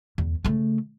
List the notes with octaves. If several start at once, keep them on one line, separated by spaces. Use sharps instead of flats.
E2
C#3 A3